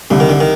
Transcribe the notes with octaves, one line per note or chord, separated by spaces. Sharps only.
C2 D3
D#3
D3
D#3